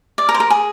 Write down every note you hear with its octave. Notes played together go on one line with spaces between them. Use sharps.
D5
A#4
C5
A#4
G#4